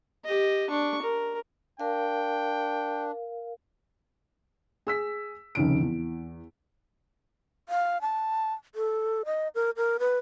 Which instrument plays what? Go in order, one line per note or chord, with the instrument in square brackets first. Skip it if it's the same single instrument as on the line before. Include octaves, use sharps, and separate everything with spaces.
[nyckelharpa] G4 D#5
D4 C#6
A#4
[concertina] D4 [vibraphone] A#4 F5 [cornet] G5
[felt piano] G#4 E6 B6
F1 D#2 C#3 D7
E2
[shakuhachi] F5
A5
A4
D#5
A#4
A#4
B4